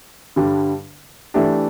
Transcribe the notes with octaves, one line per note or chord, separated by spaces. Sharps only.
G2 D3 G3
E3 A3 D4 G4